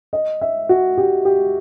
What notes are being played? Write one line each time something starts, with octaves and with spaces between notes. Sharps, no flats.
D#5
E5
F#4
G4
G4